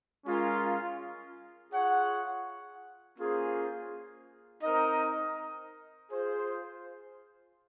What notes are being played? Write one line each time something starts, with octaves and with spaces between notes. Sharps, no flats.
G#3 C#4 F4 A#4
F4 G#4 C#5 F#5
A#3 C#4 F4 G#4 C5
C4 D#4 A#4 D#5
F4 G#4 C5